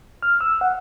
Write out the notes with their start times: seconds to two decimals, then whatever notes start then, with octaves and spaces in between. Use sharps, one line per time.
0.23 F6
0.41 E6
0.61 F#5